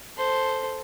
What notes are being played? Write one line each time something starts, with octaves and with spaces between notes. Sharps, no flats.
A4 C5